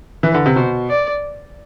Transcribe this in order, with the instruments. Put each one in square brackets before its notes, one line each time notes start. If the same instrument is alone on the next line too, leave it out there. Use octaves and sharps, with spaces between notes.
[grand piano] E3 [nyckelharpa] B4
[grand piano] D3
C3
[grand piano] B2 [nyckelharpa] C5
[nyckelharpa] D5